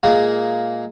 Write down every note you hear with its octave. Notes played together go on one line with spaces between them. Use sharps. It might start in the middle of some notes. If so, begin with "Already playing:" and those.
A#2 G#3 A#3